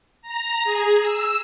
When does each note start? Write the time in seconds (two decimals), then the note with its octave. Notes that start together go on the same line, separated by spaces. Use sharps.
0.22 A#5
0.64 G#4
1.01 E6